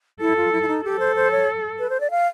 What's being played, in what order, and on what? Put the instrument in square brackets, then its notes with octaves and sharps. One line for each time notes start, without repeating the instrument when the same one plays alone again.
[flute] E4 [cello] A4
[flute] F4
E4
E4
D#4
[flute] G4 [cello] A4
[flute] C5
C5
C#5
B4
C5
D5
F5